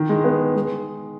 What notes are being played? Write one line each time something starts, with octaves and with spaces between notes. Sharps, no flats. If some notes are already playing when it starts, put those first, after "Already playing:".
Already playing: D#3
G#3
B3
G#3